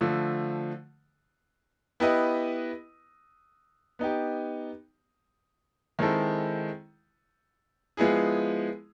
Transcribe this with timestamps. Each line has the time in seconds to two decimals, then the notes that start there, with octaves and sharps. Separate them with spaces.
0.01 D3 F3 A3
2.00 B3 E4 G4 B4 D#5
3.99 B3 D#4 G4
5.99 D#3 G#3 C4 E4 A4
7.97 F3 G#3 B3 E4 G#4